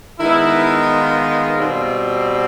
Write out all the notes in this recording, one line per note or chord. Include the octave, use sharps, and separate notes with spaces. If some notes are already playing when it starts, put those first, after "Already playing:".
D#3 G#3 B3 E4
F4
B2 G3 C4